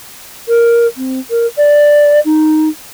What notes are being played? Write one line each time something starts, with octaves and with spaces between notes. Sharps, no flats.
A#4
C4
A#4
D5
D#4